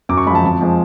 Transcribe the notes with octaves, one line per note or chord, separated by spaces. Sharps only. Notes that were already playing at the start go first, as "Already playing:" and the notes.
F#2 D6
C#6
F3 G#3 A5 B5
F2
F3 G#3